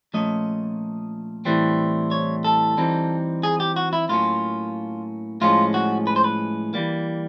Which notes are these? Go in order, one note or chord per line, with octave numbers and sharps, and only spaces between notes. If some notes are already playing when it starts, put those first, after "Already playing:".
A#2 F3 A3 C#4 D#5
A2 E3 G3 C4
C#5
A4
E3 G3 C4 D#4
G#4
G4
F#4
E4
A2 F#3 A#3 C#4 F4
A2 F3 G#3 C#4 F4
F#4
B4
C5
B4
E3 G3 A#3